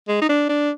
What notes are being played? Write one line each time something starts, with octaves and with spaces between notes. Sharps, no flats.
G#3
D#4
D4
D4